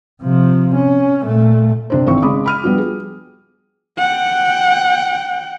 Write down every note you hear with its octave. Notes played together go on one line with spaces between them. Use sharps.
C3 F3
C#4
A#2 A3
C3 D4 C5
G#1 E3 C4 C#6
C#3 G#3 B5 D6 D#6
B5 F6 D#7
F3 G3 B3 D4 F#4
G#4
F#5 G5